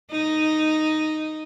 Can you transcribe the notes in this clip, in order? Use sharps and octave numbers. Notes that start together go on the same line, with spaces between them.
D#4